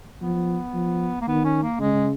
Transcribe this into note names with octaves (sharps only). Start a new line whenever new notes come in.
F3 B3
F3
A#3
D#3 B3
C#4
A#3
C#3 G#3